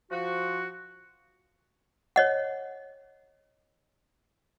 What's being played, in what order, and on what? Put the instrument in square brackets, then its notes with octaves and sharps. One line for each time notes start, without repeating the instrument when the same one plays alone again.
[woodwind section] F3 F#4
[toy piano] C#5 D#5 F#5